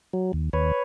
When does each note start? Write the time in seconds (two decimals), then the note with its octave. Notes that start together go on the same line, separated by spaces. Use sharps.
0.13 F#3
0.33 D#2
0.53 D#2 B4 C#5